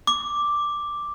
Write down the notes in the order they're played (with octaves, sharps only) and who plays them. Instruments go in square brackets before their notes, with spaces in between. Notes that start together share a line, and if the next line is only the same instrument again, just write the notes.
[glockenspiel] D6